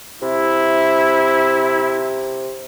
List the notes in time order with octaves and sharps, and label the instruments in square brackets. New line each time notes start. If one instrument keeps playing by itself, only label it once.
[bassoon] C3 [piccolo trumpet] E4